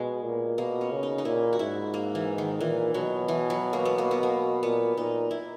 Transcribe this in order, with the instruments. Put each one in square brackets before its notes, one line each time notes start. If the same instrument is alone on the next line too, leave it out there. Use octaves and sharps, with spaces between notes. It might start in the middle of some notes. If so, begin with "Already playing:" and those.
Already playing: [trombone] B2 [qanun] G#3
[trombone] A#2
[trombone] B2 [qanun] A#3
[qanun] C#4
[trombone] C#3
[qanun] D#4
D#4
[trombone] A#2 [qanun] E4
[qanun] F#4
[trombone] G#2 [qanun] E4
[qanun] A#3
E3
D#3
[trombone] A#2 [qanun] E3
[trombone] B2 [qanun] F#3
[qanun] E3
F#3
A#3
B3
A#3
B3
A#3
[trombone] A#2 [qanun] B3
[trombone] A#2 [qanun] D#4
[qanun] E4